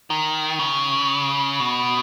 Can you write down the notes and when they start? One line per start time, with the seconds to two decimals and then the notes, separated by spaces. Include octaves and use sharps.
0.10 D#3
0.59 C#3
1.60 B2